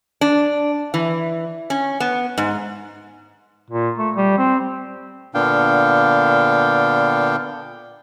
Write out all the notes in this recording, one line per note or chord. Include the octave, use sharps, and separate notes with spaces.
D4
E3
C#4
B3
G#2
A#2
A3
G3
C4
A#2 D3 B3 D4 F5 G5